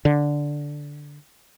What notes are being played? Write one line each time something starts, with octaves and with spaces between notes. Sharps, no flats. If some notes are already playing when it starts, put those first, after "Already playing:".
D3